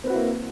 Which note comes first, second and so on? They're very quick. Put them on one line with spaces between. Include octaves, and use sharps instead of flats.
C4 B4 F#4 E4 A#3